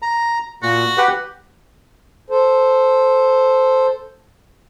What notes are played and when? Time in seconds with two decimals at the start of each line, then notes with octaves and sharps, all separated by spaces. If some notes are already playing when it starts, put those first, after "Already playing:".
0.02 A#5
0.63 A#2 F#4
0.98 G4 B4 F#5
2.30 A4 C5